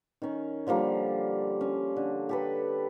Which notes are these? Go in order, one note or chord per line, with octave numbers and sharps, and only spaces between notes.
D#3 C#4
D3 F3 G3 A#3
C#4
D3
G4 A4 B4